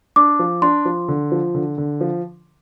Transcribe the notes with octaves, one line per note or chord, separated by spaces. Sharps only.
D4 D6
F3
D4 C6
F3
D3
F3
D3
D3
F3